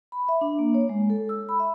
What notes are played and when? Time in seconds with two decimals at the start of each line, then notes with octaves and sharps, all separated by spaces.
0.12 B5
0.29 E5
0.41 D4
0.59 A#3
0.74 C#5
0.89 G#3
1.10 A4
1.29 E6
1.49 B5
1.60 E5